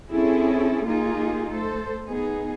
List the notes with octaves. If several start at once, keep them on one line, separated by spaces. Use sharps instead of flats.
C4 C#4 E4 G#4 A4
A#3 D#4 F4 G4 G#4
A3 A4 C5
B3 D#4 G#4